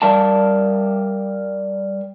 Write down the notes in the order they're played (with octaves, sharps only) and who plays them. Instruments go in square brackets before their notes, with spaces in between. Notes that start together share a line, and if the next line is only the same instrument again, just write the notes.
[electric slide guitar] G3 A#4 D5 F5 A5